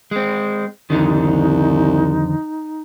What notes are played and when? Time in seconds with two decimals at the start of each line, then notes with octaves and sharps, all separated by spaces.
0.11 G#3 C4
0.90 C2 F2 D3 D#3 D#4